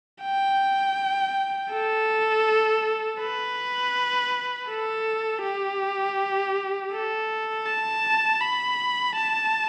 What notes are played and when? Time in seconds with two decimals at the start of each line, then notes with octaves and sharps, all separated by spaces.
0.22 G5
1.71 A4
3.20 B4
4.69 A4
5.43 G4
6.92 A4
7.66 A5
8.41 B5
9.15 A5